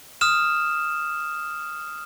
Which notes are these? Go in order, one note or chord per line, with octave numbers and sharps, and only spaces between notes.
D#6 F6 E7